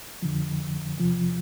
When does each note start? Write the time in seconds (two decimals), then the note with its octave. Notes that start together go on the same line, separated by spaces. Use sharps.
0.22 F2 D3 F3
0.98 E2 C3 F3